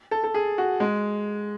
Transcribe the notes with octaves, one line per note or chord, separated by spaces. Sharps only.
A4
A4
G#4
F#4
G#3